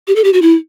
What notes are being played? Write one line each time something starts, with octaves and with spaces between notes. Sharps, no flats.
G4
A4
G4
F#4
E4